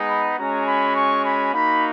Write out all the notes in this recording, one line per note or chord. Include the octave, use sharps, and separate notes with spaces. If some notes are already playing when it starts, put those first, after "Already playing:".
Already playing: G#3 B3 D#4
B5
G#3 C#4 F#4 A#5
B5
C#6
B5
A#3 D#4 F#4 B5